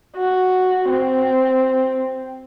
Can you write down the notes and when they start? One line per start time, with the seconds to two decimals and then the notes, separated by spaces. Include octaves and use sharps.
0.17 F#4
0.89 C4